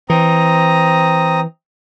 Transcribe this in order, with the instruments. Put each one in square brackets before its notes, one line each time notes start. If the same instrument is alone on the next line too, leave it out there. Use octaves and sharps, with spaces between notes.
[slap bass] E3 [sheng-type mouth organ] C4 A#5 D#6